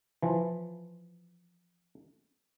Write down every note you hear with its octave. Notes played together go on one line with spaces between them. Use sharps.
E3 F3